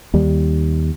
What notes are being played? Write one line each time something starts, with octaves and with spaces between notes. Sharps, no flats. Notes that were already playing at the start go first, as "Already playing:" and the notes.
D#2 G3